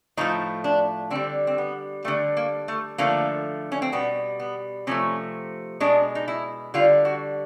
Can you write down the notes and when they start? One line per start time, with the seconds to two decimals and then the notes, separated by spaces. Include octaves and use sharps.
0.17 A2 F3 A3 D#4
0.64 D4
1.11 D3 G3 C4
1.47 C4
1.58 B3
2.04 D3 G3 A3
2.37 A#3
2.68 A3
2.98 D3 F3 A3 A#3
3.72 C#4
3.82 C4
3.92 B2 G3 B3
4.40 B3
4.87 C3 F3 A3 C#4
5.80 B2 G#3 D4
6.15 D#4
6.28 E4
6.74 D3 G3 F4
7.05 F#4